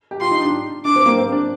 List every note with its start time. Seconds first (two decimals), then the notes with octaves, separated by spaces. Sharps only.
0.11 G4
0.21 F4 C6
0.31 D#4
0.42 D4
0.85 D4 D6
0.96 C4
1.06 A#3
1.17 C4
1.32 D4